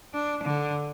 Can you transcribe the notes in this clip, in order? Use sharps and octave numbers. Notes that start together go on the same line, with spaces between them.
D4
D3